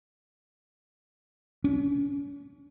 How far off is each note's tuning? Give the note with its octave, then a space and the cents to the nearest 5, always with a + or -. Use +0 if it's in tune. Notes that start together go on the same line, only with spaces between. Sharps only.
C#4 +40